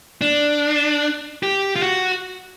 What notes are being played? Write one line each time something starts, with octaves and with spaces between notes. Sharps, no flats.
D4
G4
F4
F#4